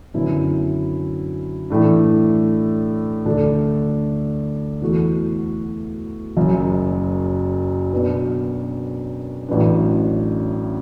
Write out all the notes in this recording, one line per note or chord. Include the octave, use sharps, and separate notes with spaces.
F#2 D3 B3 E4
A2 E3 A3 D4
D2 D3 A3 D4 A4
E2 E3 A3 F#4 A4
F#1 F#2 F#3
B2 F#3 B3 D4 B4
A1 A2 F#3 D4 B4